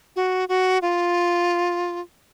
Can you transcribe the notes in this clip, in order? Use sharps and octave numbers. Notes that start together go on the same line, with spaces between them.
F#4
F#4
F4